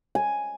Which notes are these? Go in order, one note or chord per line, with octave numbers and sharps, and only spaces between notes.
G#5